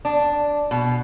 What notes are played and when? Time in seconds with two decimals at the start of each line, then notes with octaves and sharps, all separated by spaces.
0.05 D4
0.71 B2